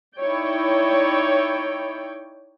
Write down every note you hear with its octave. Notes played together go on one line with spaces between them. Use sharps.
D#4 E4 C#5 D5 G5